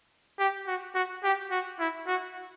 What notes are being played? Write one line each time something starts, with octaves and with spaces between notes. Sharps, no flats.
G4
F#4
F#4
G4
F#4
E4
F#4